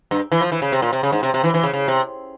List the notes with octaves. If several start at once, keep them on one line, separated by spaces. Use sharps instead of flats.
G2
E3
F3
E3
C#3
C3
A#2
C3
C#3
G#2
C3
C3
E3
E3
C#3
C#3
C3